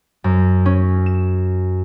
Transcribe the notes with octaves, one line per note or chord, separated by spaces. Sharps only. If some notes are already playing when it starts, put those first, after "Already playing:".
F#2
C#4
E7